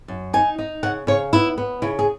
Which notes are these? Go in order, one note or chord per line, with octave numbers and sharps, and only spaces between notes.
F#2
D#4 G#5
D#4
C#3 F#5
C#3 C#5
B3 E4
B3
C#3 E4
G#4